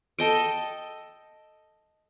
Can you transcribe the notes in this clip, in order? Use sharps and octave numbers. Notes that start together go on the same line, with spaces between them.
A4 D#5 G5